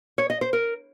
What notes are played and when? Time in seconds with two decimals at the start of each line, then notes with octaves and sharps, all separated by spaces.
0.18 C#5
0.30 D#5
0.41 C5
0.53 A#4